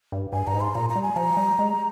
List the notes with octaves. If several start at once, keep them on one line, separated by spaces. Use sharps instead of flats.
G2
G2 G#5
G2 A#5
G#2
C6
A#2 A#5
A#5
G3
G#5
F3 A#5
G3
G#3